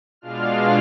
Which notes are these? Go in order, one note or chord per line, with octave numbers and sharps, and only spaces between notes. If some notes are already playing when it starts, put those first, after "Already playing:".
B2 G#3 D4 F4 F5 F6